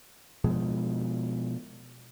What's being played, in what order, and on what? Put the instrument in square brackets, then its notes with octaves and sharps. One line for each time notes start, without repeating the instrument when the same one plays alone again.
[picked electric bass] B2 F3 G#3